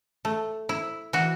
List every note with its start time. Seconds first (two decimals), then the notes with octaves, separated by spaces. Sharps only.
0.25 A3
0.69 E4
1.13 E3 F#4